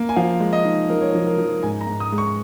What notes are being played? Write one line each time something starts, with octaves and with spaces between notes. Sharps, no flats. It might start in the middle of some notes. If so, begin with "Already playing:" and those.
Already playing: A#3
G#5
F3 F5
G#3
D#5
D#4
F3 A#4
C#5
A#4
F3
A#4
F3
G#2 G#5
A#5
G#2
D#6
G#3
C#6